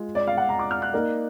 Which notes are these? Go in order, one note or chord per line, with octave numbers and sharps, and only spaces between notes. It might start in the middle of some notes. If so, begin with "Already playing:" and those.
Already playing: G#3 F4
D5
F5
F#5
A#5
D6
F6
F#6
A#3 D#4 A#4 D5